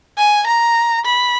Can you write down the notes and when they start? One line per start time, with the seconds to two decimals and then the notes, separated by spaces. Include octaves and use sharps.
0.18 G#5
0.47 A#5
1.05 B5